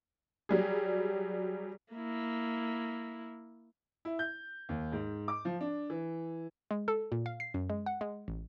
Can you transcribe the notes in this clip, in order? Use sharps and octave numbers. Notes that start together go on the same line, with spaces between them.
F#3 G3 G#4
A#3 E4
E4
G6
D#2
G#2
D6
F3
D4
E3
G#3
A4
A#2
F5
C7
F#2
G#3
F#5
G#3
A1